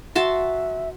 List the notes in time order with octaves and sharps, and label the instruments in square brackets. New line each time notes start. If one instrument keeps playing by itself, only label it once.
[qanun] F#4 A5 C6 [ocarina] E5